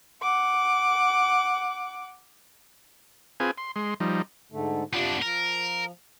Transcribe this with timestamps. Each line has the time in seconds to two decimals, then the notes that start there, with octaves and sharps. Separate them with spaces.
0.22 F#5 D6
3.40 C4 F4 G#4 B4 G#5
3.58 C6
3.76 G#3 C6
4.00 F3 G3 D#4
4.52 G#2 D3 A3
4.93 C3 B3 D4 F4 A5
5.22 F3 A#4